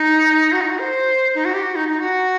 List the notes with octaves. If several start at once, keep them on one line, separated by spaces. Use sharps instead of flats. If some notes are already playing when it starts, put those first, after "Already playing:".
Already playing: D#4
F#4
D#4
F#4
C5
D#4
F#4
G4
F#4
D#4
D#4
F#4